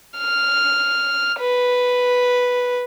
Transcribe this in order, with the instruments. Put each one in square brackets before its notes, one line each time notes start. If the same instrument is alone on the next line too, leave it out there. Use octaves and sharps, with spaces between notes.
[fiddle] F6
B4